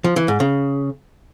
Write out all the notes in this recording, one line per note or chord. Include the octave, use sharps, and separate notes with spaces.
F3
E3
G#2
C#3